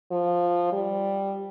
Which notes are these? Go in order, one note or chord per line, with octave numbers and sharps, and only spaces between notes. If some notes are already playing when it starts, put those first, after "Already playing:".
F3
G3